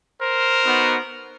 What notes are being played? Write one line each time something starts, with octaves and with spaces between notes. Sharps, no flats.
A#4 C5
B3 D#4 F#4